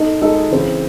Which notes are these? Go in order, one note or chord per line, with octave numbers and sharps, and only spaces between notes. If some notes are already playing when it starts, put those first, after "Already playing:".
Already playing: D#4 A4 D#5
G#3 D#4 A4 D#5
C#3 E3 C4